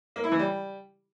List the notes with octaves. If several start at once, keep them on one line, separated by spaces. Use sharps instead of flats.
A#3
E4
E3
G3